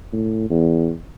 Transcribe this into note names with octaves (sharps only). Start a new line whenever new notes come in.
A2
E2